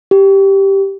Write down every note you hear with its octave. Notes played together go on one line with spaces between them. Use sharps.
G4